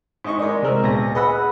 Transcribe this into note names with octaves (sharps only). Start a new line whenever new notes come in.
G#2 D#5 C#6
G#3 D#4 A#4 D5
C3 G#3 C4 A#4 E6
D2 A#2 B3 A#6
G#4 B4 D#5 F#5 B5 E6